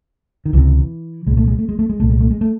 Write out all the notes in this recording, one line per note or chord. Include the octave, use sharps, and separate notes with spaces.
D#3
C#2 C3 E3
C2 A#2 G#3
A3
G#3
A3
G#3
A3
G#3
C2 A#2 A3
G#3
A3
G#3
A3